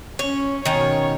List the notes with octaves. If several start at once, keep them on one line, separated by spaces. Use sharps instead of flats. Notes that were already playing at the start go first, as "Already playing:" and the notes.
C#4 C#5
B2 D#3 C#4 C#5